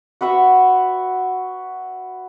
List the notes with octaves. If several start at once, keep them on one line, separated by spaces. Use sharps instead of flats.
F#4 B4 E5 F#5